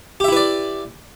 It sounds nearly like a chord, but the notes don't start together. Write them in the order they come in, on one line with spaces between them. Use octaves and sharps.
G4 E5 E4 B4 D5